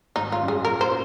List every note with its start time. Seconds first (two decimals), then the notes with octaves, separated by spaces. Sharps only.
0.16 G#1 D#4
0.32 F4
0.41 F#2 C#3 F#3
0.48 G#4
0.65 A#2 A#4
0.81 C5
0.89 C#4